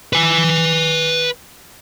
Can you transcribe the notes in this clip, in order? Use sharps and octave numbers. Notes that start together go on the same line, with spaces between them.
B4 G#5